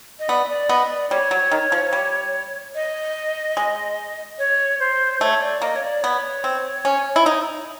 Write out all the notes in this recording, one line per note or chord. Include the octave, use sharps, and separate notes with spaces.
D#5
B3 D5
D5
B3 D#5
D5
G3 C#5
F#3
D#3
F3
G3
D#5
G#3
C#5
C5
A3 C#5
D5
A#3 D#5
C#5
D5
B3 C#5
C4
C#4
E4
D#4